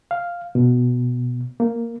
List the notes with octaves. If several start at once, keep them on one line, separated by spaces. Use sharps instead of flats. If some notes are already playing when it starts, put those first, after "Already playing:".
F5
B2
A#3